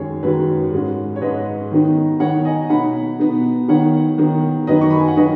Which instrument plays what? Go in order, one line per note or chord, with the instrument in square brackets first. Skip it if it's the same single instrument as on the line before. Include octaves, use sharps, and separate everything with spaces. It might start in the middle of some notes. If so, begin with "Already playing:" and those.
Already playing: [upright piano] F#2 D#3 G#3 G#4 C#5
F#2 D#3 G#3 F#4 B4
G#2 G#3 C#4
C#5
G#2 G#3 C#4 B4 D#5
D#3 B3 D#4
D#3 B3 D#4 C#5 F#5
D#5 G#5
B2 B3 D#4 F#5 B5
B2 B3 D#4
D#3 B3 D#4 C#5 F#5
D#3 B3 D#4
F#2 D#3 F#3 D#4 B4 D#5
C#6
B5
G#5
F#5
D#3 F#3 D#4 B4 D#5